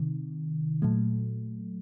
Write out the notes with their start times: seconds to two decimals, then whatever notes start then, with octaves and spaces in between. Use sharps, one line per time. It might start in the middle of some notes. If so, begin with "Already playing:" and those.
Already playing: C3 D#3
0.82 A#2 F#3 A3